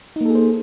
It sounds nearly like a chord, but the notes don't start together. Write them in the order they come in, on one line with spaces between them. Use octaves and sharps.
D#4 A#3 A4 G#4 C5